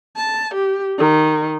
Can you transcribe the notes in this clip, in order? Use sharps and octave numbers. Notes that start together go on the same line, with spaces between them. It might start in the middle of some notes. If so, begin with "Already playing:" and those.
A5
G4
D#3